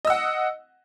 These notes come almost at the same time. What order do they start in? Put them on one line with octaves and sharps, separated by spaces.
D#5 E6 F#5